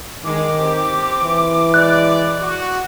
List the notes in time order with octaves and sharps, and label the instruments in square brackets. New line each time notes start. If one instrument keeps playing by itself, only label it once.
[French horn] D#3 [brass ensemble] G#3 [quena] D6
[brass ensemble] C4 G4
[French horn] E3
[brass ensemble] G#3 B4 D5 [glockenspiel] F#6
[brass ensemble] F#4